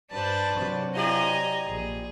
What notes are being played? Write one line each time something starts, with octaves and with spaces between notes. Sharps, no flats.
G2 D4 B4 C5 A5
C3 F#3
E4 G4 D5 D#5 G#5 A#5
A#1 G#4